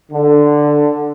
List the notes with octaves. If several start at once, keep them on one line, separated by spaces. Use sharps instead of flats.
D3